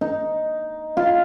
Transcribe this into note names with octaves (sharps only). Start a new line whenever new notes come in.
D#4
F4